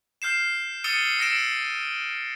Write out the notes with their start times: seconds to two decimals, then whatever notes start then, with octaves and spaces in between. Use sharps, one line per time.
0.22 F6 G6 C7 E7
0.84 D#6 E6 A6 C#7 D#7 G7
1.19 E6 A#6 C#7 D7 E7